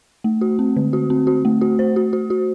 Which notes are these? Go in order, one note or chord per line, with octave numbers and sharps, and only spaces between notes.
A3
F#4
C4
D3
F#4
C4
F#4
A3
F#4
C5
F#4
F#4
F#4